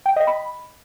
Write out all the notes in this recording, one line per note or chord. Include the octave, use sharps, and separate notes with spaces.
G5
D#5
B5